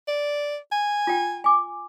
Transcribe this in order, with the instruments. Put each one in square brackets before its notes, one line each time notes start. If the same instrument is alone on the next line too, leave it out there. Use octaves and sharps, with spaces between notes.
[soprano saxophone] D5
G#5
[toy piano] F4 G5
G#5 D6